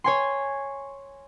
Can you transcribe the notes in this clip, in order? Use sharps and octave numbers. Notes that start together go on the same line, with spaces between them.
C#5 G#5 C6